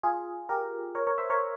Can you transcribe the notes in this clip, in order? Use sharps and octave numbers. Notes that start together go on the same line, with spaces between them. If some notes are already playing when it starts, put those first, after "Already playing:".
F4 G#4
G4 A#4
A#4 C#5
A#4 C#5
C5 E5
A#4 C#5